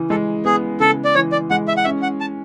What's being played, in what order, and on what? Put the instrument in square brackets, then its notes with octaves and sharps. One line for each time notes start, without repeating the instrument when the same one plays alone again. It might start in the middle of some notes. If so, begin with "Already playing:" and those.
Already playing: [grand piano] C#3 E3
[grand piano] G#3 [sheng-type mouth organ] A4
[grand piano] B3 [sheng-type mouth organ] G#4
[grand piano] C#3 [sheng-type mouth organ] A4
[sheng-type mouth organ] D5
[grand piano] E3 [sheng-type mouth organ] C#5
[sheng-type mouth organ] D5
[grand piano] G#3 [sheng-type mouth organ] F#5
[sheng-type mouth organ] E5
F#5
[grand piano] C#4 [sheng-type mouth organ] E5
[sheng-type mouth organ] F#5
A5